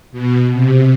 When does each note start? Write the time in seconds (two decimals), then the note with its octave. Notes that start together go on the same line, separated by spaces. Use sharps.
0.12 B2
0.52 C3